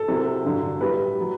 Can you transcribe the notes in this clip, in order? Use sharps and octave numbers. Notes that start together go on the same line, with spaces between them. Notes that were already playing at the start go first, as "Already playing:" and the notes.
Already playing: A4
C2 C3 F#3
G2 D3 F#3
A2 G3 B4
F#3